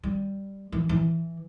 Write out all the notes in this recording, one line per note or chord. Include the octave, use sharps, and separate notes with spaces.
G3
E3
E3